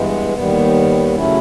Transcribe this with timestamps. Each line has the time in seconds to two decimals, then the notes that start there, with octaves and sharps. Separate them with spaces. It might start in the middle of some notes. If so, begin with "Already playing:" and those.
Already playing: G2 E3 G#3 B3
0.34 D#2 D#3 G3 B3
1.15 C#3 F#3 A3 C#4 E4